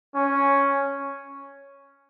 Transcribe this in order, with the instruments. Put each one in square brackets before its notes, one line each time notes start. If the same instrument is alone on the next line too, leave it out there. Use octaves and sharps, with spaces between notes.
[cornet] C#4